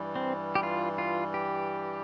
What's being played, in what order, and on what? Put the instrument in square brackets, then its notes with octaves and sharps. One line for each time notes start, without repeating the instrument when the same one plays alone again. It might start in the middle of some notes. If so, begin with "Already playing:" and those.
Already playing: [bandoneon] G2 E3 G3
[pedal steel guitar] C4
G4
F4
F4
G4